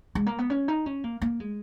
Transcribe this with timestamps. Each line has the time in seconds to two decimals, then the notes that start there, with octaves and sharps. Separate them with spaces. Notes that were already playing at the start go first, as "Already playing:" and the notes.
0.15 G#3
0.26 A#3
0.38 B3
0.50 C#4
0.68 D#4
0.86 C#4
1.04 A#3
1.22 A#3
1.40 G#3